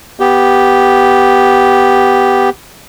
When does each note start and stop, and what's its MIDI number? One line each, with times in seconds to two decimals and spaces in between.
0.20 2.49 59
0.20 2.49 67